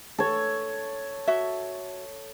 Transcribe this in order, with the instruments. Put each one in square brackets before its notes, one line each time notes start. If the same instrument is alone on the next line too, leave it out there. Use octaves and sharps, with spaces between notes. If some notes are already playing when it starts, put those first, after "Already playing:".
[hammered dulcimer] A4 C#5
[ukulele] F#4 E5